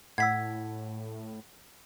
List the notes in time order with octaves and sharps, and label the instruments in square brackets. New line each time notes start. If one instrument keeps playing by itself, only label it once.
[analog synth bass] A2 [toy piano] F#5 E6 [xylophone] G#6 B6